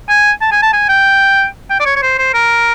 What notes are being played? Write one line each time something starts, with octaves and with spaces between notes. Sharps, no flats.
G#5
A5
G#5
A5
G#5
G5
G5
D5
C#5
C#5
C5
C5
A#4